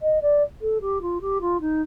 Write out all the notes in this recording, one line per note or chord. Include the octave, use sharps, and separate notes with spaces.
D#5
D5
A4
G4
F4
G4
F4
D#4